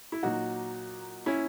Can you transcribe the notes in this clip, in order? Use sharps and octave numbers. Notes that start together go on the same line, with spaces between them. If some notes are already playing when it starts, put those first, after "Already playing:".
E4
A#2 F#3 D#4 F#4
C#4 E4